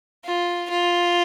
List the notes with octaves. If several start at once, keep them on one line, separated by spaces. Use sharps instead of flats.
F4
F4